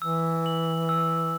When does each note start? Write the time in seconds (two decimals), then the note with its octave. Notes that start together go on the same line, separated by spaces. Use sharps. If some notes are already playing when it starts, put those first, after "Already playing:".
0.02 E3 E6
0.46 F#7
0.89 E6